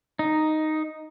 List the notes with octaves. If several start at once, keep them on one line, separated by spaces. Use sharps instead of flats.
D#4